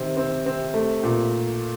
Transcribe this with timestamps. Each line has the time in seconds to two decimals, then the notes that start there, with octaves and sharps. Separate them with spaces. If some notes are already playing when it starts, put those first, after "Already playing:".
Already playing: C3 D#3 C4
0.17 C4
0.46 C4
0.74 A3
1.03 A#2